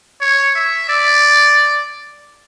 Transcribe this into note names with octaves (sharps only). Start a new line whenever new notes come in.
C#5
E5
D5